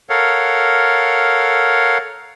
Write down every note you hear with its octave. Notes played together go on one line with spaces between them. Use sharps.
A4 A#4 C#5 F5 F#5